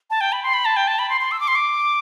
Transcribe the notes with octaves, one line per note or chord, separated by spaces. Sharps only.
A5
G5
B5
C6
B5
A5
G5
A5
B5
C6
C6
E6
D6
C6
D6